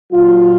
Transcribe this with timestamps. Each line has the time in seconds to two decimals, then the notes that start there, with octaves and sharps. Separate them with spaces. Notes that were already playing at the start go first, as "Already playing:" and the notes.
0.13 A#2 F#3 F4